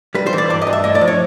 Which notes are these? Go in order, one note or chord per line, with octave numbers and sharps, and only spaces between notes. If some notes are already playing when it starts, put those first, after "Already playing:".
G3 B4
C5
E3
D5
G2 D5
D#5
G2
E5
A2 D#5
D5
F3
C#5